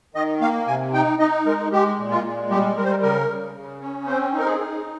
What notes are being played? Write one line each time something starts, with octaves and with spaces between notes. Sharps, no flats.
D#3 D#5
A#3 F5
C3 G#5
D#4 G5
D#4 D#5
G#3 A#4
G#3 G4
A#2
F4
G#3
G3 G4
G3 A#4
C5
A#4
C#3 A#4
C#3
C#3
C#4
C4 C5
D#4
A#4
G#4
D#4